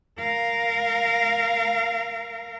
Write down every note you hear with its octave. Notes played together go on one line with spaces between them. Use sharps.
A#4 F5